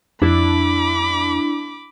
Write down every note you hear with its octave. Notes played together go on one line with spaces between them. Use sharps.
F2 D4 E4 B5 D6